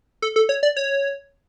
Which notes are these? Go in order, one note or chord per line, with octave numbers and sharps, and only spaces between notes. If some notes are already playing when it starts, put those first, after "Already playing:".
A4
A4
C#5
D5
C#5